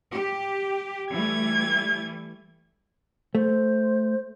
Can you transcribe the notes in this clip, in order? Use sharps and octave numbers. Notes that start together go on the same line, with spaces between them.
G4
E3 G3 A3 G#6
A3 C5